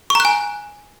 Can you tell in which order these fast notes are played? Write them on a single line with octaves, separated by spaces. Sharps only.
C#6 A#5 F#6 G#5